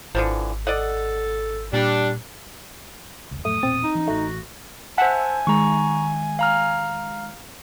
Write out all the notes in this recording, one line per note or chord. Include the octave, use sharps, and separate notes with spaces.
G#1 D3 E3 F3
A4 D5 D#5 F#5
A#2 G3 D4
F1 C#2
F2 A2 F#3 A3 D#6
E1 A#2 B3 C4 A6
D#4
E3 C4 C#4
A1 A3 F#4
C5 E5 F#5 G#5 A5
D#3 G#3 A#5 C#6
F5 A#5 F6